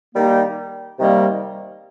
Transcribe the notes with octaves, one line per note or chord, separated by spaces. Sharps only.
D#3 G3 A#3 D#4 G4
C3 D#3 G3 A#3